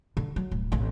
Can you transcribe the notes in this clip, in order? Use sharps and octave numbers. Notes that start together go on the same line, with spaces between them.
D3
F#3
D1
A1 C4